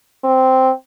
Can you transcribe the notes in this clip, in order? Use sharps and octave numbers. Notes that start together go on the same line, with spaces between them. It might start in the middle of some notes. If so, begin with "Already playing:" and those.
C4